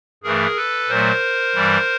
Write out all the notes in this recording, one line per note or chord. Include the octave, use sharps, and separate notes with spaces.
G2 E3 A3 G#4 A#4
A4 B4
A#2 F#3 A3 A#4 C5
G2 E3 G3